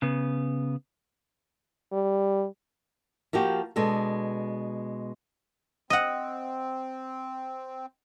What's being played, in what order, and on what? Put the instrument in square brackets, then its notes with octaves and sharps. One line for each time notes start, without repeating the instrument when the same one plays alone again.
[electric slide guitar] C#3 B3
[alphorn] G3
[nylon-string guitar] F3 A#3 F#4 G4
B2 G#3 D4 A4
[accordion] C4 [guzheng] D#5 F#5